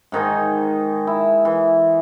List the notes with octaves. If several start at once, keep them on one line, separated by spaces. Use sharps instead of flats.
G#2 D#3 D#4 G#5
E4
E3